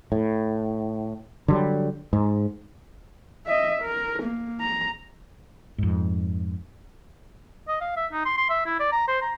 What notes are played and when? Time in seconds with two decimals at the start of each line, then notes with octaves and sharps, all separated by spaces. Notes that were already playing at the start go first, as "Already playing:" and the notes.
0.12 A2
1.48 D3 F#3 G3
2.13 G#2
3.47 D#5 E5
3.82 A#4
4.22 A#3
4.60 A#5
5.78 F2 G#2
7.68 D#5
7.81 F5
7.97 E5
8.13 D#4
8.26 C6
8.38 C6
8.50 E5
8.66 E4
8.80 D5
8.92 A#5
9.08 C5
9.22 A#5